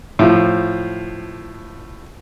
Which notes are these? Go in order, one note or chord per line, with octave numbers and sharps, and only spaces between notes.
A2 F3